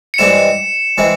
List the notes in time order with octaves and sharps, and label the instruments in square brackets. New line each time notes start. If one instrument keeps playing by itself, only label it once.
[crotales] C#7
[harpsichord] G2 E3 G#3 C4 E4 [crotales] E7
[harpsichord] E3 G#3 C4 E4